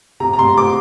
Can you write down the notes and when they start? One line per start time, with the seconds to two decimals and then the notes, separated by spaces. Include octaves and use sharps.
0.20 C3 A#5
0.33 A#5
0.38 C3 C6
0.57 C3 D6